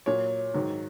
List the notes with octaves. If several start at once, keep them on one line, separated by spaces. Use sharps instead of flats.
A#2 F#3 C#5
G#2 D#3 F#3